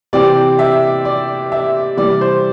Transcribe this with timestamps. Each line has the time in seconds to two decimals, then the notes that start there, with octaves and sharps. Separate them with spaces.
0.13 C3 E3 C4 D5
0.59 E5
1.05 D5
1.52 E5
1.97 C3 E3 G3 D5
2.21 C5